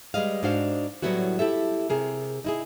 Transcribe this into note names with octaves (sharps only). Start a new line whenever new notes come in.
G3 G#3 B4 D#5 F5
G#2 D4 F#4 C5 F5
A2 F#3 G3 B3 E4 F#4
E4 G4 A4 E5
C3 G#4 A#4
D#4 E4 G#4